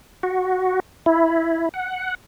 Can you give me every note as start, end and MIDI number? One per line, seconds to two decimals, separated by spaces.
0.23 0.80 66
1.06 1.69 64
1.74 2.15 78